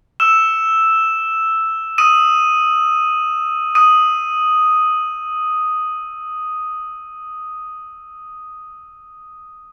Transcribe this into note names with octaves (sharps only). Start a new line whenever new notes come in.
E6 E7
D#6 D#7
D#6 D#7